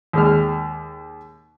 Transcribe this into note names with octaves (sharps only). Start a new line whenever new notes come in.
D#2 G#3 F6